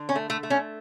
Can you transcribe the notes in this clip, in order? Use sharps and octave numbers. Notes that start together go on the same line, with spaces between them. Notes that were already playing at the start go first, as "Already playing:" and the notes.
Already playing: D3
C#4
A3
A3
A3
C#4